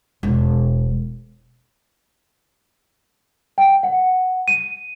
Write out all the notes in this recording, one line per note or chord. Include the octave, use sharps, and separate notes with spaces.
E1
G5
F#5
D#7